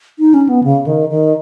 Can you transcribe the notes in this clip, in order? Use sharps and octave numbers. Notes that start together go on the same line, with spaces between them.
D#4
C#4
B3
C#3
D#3
D#3